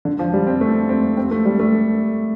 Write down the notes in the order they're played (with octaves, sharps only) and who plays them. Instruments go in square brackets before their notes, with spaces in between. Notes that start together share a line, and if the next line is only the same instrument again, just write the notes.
[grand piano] D3
F3
G3
C4
A3
C4
C4
A3
G3
A3